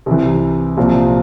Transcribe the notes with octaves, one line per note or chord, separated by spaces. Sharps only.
C2 C3 E3
C2 A#2 F3